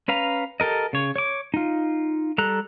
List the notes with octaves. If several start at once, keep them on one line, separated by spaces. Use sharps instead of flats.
C#4 B4 F5 A#5
G4 A4 A#4 D#5
C#3 C#5
C#5 D6
D#4 F4
G3 A4 A#5 F#6